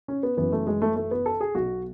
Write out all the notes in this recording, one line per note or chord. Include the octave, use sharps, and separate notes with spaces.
C#4
B3
F#1 F#2 E3 B3
A3
G#3
A3
A3
B3
A4
G#4
B1 B2 F#4